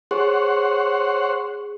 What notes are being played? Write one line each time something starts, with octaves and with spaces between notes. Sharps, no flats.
G#4 C5 C#5 F#5